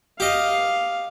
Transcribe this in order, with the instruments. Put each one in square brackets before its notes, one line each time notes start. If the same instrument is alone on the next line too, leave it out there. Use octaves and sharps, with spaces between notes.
[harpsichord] G4 D#5 [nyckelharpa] F5